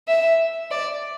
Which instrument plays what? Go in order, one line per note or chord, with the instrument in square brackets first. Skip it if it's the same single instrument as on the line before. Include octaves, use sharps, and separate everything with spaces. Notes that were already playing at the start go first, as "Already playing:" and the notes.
[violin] E5
D5